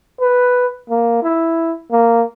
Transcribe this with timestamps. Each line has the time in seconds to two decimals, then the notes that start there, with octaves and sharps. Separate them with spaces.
0.21 B4
0.90 A#3
1.23 E4
1.92 A#3